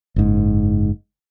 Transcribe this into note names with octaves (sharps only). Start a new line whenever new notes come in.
F#1 G#2